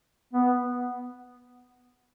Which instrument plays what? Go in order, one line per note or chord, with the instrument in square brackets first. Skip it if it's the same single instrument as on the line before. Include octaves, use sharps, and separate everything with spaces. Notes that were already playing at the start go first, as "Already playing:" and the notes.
[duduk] B3